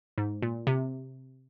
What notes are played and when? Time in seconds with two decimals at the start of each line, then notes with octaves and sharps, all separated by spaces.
0.18 G#2
0.42 A#2
0.67 C3